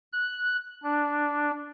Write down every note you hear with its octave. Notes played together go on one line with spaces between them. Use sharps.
F#6
D4